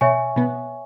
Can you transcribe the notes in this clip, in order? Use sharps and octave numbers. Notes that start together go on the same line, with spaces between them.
B2 C#5 E5 G#5 C#6
B2 B3